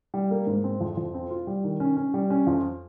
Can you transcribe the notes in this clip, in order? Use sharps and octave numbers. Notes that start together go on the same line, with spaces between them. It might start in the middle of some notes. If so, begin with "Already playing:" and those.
G3
A#3
G#2
C4
F2
F2
C4
F4
G3
D#3
C#4
C#4
G3
C#4
F2